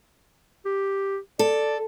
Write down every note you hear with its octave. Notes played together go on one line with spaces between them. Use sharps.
G4
A4 D5